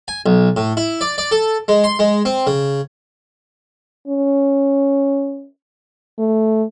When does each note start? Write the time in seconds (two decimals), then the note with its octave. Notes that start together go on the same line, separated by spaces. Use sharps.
0.08 G#5
0.26 B1
0.57 A2
0.77 E4
1.01 D5
1.18 D5
1.31 A4
1.68 G#3
1.84 C6
1.99 G#3
2.25 C4
2.47 C#3
4.08 C#4
6.19 A3